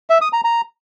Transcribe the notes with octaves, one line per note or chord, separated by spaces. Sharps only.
E5
D#6
A#5
A#5